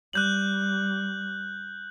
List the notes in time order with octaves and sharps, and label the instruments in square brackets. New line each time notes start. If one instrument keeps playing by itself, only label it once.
[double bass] G3 [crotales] F#6 G6 F#7